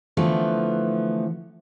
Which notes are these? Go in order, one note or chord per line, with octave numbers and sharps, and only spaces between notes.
D3 E3 F3 A3 B3